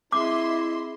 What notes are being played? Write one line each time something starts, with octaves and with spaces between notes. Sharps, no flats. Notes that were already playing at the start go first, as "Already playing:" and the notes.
C4 E4 G#4 D#5 E5 C6 D6